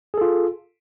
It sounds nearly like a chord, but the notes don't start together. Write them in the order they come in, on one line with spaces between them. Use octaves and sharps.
G#4 A4 F4